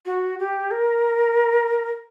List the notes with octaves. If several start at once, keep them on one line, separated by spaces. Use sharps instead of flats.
F#4
G4
A#4